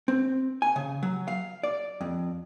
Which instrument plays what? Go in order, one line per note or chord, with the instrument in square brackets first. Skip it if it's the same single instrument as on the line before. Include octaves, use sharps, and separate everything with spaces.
[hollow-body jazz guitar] C4
G#5
C#3
F#3
F5
D5
F2